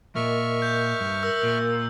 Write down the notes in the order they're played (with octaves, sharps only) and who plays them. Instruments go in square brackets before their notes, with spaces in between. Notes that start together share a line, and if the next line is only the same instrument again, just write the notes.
[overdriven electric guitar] A#2 [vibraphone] A#4 D#5 [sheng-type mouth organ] E5 C#6 F6
[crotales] G6
[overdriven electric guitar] G2
[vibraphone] A#4 [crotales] E6
[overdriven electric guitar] A#2